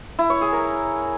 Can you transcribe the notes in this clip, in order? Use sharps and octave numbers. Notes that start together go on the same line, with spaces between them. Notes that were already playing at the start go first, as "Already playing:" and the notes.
E4
C#5
G#4
A#4